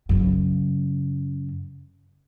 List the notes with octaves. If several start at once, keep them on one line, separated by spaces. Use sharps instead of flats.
F#2 C#3